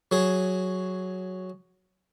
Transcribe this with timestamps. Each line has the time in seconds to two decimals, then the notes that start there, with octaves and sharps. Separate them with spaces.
0.11 F#3 G#4